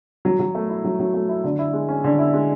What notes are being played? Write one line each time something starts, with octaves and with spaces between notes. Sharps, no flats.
F#3
F#3
A3
E4
F#3
F#3
A3
E4
D3
E4
G#3
C#4
D3
E4
G#3